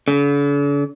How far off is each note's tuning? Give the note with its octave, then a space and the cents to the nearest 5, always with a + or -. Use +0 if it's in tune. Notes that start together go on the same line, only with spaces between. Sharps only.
D3 -45